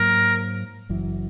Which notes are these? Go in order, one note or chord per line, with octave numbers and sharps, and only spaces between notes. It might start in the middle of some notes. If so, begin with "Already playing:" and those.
Already playing: G#2 F#3 A#3 A#4
F#1 F#2 E3